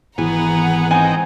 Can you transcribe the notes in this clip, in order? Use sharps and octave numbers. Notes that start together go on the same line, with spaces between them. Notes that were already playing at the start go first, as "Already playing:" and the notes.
G#1 E3 B3 G#4 F#5 A#5
C4 D#4 G5 G#5